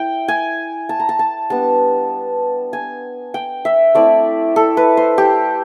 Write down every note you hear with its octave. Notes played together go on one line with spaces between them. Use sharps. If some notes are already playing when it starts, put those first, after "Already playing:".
Already playing: E4 G5
G#5
A5
A#5
A5
A5
G3 B3 D4 A5
G#5
G5
E5
A3 C4 E4 D5
A4
B4
C5
G4